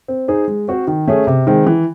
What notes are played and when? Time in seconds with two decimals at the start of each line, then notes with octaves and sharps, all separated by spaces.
0.08 C4
0.28 D#4 G#4 C5
0.48 G#3
0.68 C4 F#4 C5
0.87 D#3
1.08 A3 C#4 G#4
1.27 C3
1.47 D#3 G#3 C4
1.67 E3